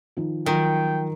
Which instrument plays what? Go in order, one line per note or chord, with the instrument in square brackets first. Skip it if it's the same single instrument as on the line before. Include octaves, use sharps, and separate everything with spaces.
[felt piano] D#3 F3
[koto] D#3 [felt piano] F3 F#3 F4 [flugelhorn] G5